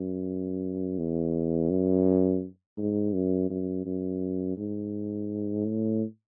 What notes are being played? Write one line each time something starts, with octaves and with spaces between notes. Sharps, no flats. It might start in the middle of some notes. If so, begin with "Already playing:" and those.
Already playing: F#2
E2
F#2
G#2
F#2
F#2
F#2
G#2
A2